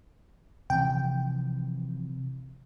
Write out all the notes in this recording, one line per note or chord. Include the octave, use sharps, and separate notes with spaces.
C3 E3 F3 G5